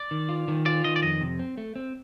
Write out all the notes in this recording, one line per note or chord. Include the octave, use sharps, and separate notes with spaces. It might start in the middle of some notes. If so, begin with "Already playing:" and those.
Already playing: D5
D#3
F4
D#3
F4 D5
D#3 D#5
D5
F2 D#5
C3
C4
A3
C4